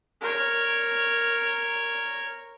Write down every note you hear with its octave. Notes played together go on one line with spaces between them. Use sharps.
A#4 C#5